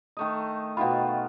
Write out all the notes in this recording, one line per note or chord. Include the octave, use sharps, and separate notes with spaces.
D#3 A3 D#5
B2 D#3 F4 F5 G5 B5